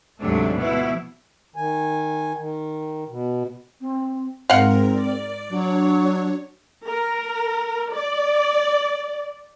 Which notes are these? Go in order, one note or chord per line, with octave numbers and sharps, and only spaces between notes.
D2 G#2 C3 F#3 A3 D4
B2 F3 B3 E4
D#3 G#5
D#3
B2
C4
G#2 C4 A#4 F5 F#5
D5
F#3 D4 C#5
A#4
D5